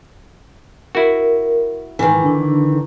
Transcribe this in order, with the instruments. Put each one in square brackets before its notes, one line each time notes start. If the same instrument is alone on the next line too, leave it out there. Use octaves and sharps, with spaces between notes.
[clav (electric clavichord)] E4 F#4 [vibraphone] A#4
[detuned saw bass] G#2 [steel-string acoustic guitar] D#3 E3 [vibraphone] G#5
[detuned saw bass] D3 [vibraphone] D4 E4